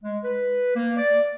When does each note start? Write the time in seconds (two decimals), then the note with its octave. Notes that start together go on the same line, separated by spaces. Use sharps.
0.03 G#3
0.23 B4
0.75 A#3
0.97 D5